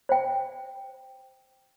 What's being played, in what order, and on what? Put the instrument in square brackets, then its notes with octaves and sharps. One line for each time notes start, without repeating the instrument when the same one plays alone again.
[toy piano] C5 G5